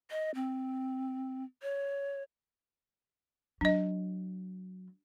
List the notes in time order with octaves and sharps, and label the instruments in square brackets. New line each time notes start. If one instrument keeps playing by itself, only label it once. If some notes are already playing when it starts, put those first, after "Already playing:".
[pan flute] D#5
C4
C#5
[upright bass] F#3 [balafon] D4 D#5